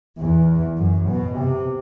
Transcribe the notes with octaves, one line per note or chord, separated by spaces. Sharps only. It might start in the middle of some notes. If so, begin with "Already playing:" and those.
E2
F#2
B2
C3